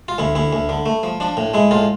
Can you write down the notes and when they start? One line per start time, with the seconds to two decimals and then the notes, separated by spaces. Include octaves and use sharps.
0.08 F4
0.18 D2 E4
0.35 D2 E4
0.53 D2
0.69 D3
0.86 A3
1.03 F3
1.20 F3 D4
1.37 A2
1.54 G#3 E4
1.71 A2 F4